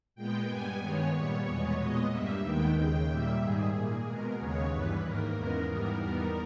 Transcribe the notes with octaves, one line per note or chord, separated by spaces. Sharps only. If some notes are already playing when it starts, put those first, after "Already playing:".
A#2 G#3 B3 G5
G2 G3 B3 G#5
G2 D#3 G#3 B3 C#5
A#2 G3 B3
E2 B2 G#3 B3
A#2 G#3 B3 D#5
G2 G3 A#3 E5
D#2 D#3 G#3 B3 G5
D#2 C#3 G#3 G5
A#2 G3 A#3 E5
G#2 D#3 G3 G#4
A#2 A#3
B2 G#3 B3 A#4
D#2 C#3 G#3 B3 C#5
G2 E3 G3 B3 B4
G#2 D#3 A#3 A#4
E2 C#3 G#3 B3
G#2 E3 G3 B3 A#4
E2 D#3 G3 B3